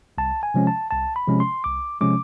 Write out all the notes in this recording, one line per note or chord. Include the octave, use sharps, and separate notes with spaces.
C2 A5
G#5
C3 F3 G#3 C#4
A5
C2 A5
B5
C3 F3 G#3 C#4
C6
C2 D6
C3 F3 G#3 C#4 D6